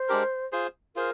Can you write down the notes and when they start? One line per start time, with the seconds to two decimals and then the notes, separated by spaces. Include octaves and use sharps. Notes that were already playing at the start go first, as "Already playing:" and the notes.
Already playing: C5
0.08 G#3 D4 G4 A#4
0.52 F4 G#4 C5
0.96 F4 G#4 A#4 C5